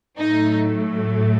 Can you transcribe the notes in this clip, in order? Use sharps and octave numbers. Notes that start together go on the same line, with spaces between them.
A2 F#3 A3 D#4